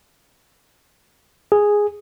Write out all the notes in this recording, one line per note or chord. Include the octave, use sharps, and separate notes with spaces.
G#4